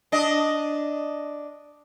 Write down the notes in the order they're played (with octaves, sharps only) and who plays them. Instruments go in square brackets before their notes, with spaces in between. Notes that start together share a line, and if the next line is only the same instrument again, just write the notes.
[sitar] D4 D#5